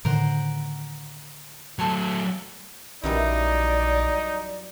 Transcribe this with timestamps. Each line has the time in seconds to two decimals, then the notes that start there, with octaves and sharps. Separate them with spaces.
0.05 A2 D3 D#3 A#4 C5 F#5
1.79 F#3 A3 C5 A5 C6
3.04 A#1 F#2 E3 G3 D#4 D5